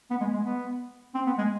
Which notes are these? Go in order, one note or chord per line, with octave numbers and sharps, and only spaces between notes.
B3
G#3
G#3
B3
C4
B3
G#3